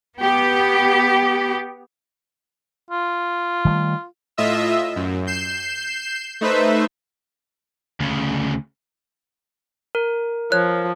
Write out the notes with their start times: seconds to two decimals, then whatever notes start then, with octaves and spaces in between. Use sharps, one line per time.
0.20 B3 G4
2.90 F4
3.65 D#3 G3 A3
4.37 A2 F4 D#5 E5 E6
4.96 F#2
5.27 G6 C7 E7
6.41 A3 D#4 B4 C5 E5
8.00 D2 C#3
9.95 A#4
10.52 F3 C#5 F#6